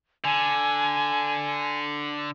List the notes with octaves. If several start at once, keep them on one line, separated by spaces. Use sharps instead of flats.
D3 G#5